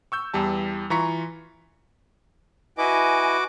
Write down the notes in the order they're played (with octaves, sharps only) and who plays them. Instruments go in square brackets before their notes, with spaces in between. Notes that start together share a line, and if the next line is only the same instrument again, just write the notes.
[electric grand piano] C#6 E6 G6
E2 E3 G3 A5
E3 F4 A#5 C#6 B6 C#7
[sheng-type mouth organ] E4 B4 D#5 [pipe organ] F#4 D6 [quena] G#5